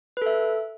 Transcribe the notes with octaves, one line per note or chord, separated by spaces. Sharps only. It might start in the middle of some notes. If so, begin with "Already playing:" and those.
A4 B4 E5